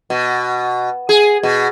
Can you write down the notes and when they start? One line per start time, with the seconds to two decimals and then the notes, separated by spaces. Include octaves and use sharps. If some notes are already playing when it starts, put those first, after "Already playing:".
0.10 B2
1.09 G#4
1.43 B2